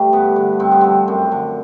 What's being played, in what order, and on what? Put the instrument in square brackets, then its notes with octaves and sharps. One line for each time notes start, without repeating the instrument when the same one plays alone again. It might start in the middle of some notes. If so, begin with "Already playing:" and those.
Already playing: [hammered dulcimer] E3 G3 A3
G2 B3
D3
G2 C4
B3
F3 C4
F#2 C4
D3